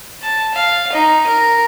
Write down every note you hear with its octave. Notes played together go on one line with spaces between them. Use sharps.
A5
F5
D#4
A#4